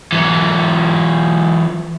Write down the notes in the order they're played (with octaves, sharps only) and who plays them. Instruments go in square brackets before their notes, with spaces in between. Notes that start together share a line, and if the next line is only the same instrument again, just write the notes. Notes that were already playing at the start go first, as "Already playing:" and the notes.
[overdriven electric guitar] E3 F#3